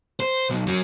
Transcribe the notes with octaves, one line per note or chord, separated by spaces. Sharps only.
C5
B1
F#3 C#4